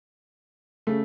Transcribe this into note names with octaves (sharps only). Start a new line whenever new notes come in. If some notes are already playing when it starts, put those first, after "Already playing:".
C#3 A3